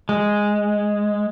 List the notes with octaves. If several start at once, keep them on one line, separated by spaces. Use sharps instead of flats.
G#3